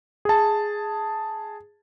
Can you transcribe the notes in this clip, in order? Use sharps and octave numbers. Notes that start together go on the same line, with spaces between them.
G#4 A5